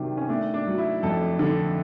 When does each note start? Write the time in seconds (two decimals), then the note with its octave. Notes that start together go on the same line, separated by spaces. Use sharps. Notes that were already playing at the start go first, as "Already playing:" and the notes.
Already playing: C3 D#3 F#3 D4
0.17 C#4
0.29 A3 D4
0.54 D4
0.67 F#3
0.78 E4
1.03 F2 A4
1.39 D3